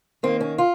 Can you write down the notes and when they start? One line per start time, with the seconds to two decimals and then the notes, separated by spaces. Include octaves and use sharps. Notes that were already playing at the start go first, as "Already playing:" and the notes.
0.23 D#3 A#3 C4
0.41 C#4
0.58 F4